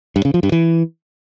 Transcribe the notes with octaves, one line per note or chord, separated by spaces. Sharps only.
G2
C#3
F3
G2
E3